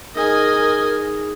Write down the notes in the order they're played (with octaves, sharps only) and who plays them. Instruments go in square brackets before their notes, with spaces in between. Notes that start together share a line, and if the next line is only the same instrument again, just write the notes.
[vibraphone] D#4 G#4 D#6 [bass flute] A#4 [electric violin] D#5 G#5